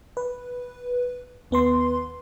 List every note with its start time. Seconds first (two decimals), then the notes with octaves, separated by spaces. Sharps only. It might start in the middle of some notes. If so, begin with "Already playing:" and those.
0.17 B4
1.51 D#2 B3 B4 C6